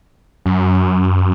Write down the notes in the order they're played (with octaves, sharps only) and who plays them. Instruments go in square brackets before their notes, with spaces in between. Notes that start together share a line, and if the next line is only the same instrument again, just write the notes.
[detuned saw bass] F#2